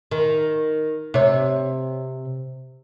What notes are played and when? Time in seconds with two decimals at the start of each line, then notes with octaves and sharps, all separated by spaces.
0.11 D#3
1.14 C3 C#5